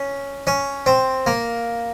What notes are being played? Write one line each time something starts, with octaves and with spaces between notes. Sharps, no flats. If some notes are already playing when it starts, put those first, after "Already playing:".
Already playing: C#4
C#4
C4
A#3